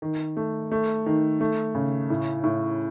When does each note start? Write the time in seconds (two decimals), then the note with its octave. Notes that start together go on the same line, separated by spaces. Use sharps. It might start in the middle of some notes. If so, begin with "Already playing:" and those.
0.02 D#3
0.37 A3
0.71 A3
1.06 D#3
1.41 A3
1.75 C#3
2.10 A2
2.44 A2